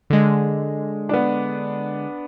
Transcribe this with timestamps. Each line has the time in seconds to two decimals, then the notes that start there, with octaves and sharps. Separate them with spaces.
0.10 D3 G#3
1.09 B3 D4